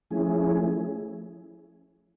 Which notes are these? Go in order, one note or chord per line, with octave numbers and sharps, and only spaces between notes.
F3 A3 C#4 E4 G#4